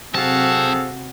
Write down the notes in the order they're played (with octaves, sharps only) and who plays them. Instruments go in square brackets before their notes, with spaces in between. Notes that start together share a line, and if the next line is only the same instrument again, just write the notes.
[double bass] C3 [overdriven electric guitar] F#3 A5 [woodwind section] C4 G#4 A4 [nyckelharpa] F#4 F5